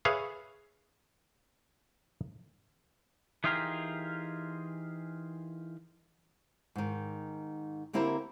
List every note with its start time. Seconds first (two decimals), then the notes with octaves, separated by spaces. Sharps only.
0.05 G#4 B4 C#5 E5 F5
3.44 E3 D#4 F4 G4 G#4 A#4
6.76 G#2 D#3
7.93 D3 A#3 C4 E4 G4 A#4